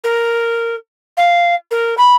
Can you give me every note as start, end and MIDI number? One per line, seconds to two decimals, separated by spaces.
0.04 0.75 70
1.17 1.55 77
1.71 1.95 70
1.97 2.16 83